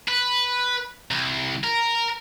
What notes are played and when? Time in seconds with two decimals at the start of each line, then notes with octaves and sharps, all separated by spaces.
0.08 B4
1.11 C2
1.64 A#4